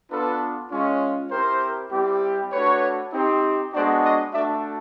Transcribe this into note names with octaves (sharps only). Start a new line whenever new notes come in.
B3 D4 F4 A4 B4
G#3 C#4 F4
C4 E4 G4 A#4 C5
G3 C4 E4 G4
A3 D4 F#4 B4 C#5
C4 D#4 G4
G#3 B3 D4 F#4 C5 D5
C#5 D#5
A3 D4 F#4 D5 E5